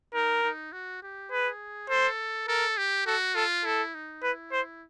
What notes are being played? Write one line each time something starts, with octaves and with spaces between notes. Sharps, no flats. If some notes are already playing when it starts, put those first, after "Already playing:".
D#4 A#4
D#4
F#4
G4
G#4 B4
A4 C5
A4 A#4
G4
F#4 A4
F4 A4
E4 A4
D#4
E4 B4
C5